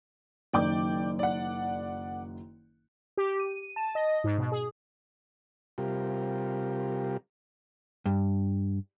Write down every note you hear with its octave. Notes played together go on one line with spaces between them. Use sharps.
F#1 F#2 D#3 D5 G5 D6
D5 F#5
G4
D#7
A5
D#5
G#2
B2
G#4
C3 G3 F4 G4 A#4
G2